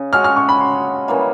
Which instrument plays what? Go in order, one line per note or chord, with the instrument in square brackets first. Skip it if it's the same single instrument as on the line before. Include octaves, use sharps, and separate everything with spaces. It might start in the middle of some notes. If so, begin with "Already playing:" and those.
Already playing: [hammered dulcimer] C#3
[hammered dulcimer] G#3 C#4 F#4 A4 [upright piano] F6
[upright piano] F6
C#6
B5
C6
[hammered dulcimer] C#3 E3 G3 A#3